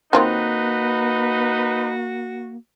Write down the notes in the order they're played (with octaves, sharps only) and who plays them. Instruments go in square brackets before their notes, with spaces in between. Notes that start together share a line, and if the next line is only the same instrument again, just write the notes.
[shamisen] D#3 C4 F4 [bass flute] A#3 [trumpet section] D#4 B4 [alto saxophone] F#4